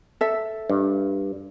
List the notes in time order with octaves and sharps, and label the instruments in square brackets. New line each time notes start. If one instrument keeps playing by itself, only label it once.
[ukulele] A4 E5
[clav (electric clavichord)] G2